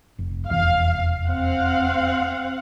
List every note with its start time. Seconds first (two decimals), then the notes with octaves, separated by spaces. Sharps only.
0.19 F1
0.50 F1 E2 F5
1.27 C4 F5 F#5